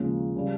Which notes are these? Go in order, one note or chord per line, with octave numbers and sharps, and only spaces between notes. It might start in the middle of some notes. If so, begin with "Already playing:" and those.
Already playing: D#2 C#3 F3 G#3 C#4
C#3 G3